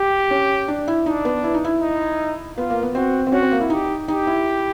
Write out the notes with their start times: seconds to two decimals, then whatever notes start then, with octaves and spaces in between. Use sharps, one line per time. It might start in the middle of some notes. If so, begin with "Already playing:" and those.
Already playing: G4
0.31 C#4
0.68 D4
0.88 E4
1.06 D4 D#4
1.25 B3
1.44 E4
1.54 D#4
1.65 E4
1.82 D#4
2.57 B3 F4
2.70 A#3
2.83 B3
2.95 C4 F#4
3.27 C4
3.32 C#4 F#4
3.42 C4
3.51 A#3
3.60 E4
3.70 D#4 G4
4.08 D#4 G4
4.27 E4